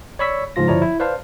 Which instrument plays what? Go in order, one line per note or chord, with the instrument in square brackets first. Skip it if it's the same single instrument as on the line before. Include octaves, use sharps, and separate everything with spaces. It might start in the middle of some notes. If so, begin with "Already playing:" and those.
[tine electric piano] C#5 D5 B5 C#6 E6 B6
G#2 C#3 F3 F4 A#6
G1 F3 E4 C#5 D5 A#5
E4
B4 C5 D5 F5 A5